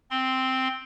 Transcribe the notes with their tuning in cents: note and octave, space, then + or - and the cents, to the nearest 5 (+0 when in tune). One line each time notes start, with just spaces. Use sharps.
C4 -5 C6 +0